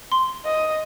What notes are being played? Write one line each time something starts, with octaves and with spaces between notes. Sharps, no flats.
C6
D#5